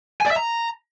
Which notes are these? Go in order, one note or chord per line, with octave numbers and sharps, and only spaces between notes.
G#5
D5
E5
A#5